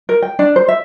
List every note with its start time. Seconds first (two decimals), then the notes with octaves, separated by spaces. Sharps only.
0.09 A#4
0.23 G5
0.39 D4
0.56 C5
0.68 E5